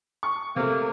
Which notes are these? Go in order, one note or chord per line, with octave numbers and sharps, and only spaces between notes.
C#6
C3 A3 A#3